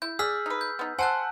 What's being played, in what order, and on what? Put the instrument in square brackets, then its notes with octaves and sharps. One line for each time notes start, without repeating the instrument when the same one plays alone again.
[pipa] E4 [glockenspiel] G6
[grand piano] G#4 [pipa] D5 [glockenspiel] E6 F6 B6
[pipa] D#4 B4
[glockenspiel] G6
[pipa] B3 D#4
[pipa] A4 C5 [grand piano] F#5 [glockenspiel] G#5 A5 F#6